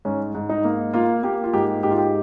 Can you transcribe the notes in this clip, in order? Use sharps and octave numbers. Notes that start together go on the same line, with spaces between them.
G#2 C#4
G#2
D#4
A#3
A#3 F4
A#3 G4
F4
G#2 G4
G#2 G4
F4
G4